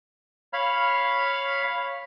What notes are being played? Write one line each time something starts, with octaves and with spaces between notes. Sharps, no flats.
C#5 F5 B5 F6